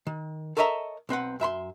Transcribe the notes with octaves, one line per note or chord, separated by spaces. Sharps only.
D#3
A4 A#4 C#5 D#5 E5 A#5
B1 C4 B4 F#5
F#2 E5 B5 C6